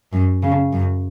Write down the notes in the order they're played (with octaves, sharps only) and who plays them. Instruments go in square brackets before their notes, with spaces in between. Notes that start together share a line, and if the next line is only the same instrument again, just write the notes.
[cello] F#2
C#3
F#2